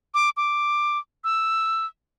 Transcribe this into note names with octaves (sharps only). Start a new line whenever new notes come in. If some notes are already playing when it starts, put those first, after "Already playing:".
D6
D6
E6